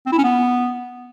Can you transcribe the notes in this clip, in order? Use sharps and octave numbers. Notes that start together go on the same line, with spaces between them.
C4
E4
C#4
B3